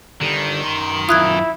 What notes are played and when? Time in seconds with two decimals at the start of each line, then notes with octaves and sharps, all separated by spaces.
0.21 D3 D#3 G3
0.64 F#2 C6
1.09 F#2 E4 F4 D#6 F#6 G#6